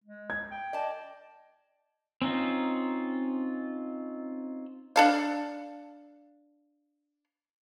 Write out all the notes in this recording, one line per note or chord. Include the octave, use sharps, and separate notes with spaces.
G#3
G#6
G5
D5 D#5 A5
C4 C#4 D#4 F4
D4 A4 F5